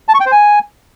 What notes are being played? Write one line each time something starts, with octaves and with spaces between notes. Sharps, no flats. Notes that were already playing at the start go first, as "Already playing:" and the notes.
A5
C#6
G5
C5
G#5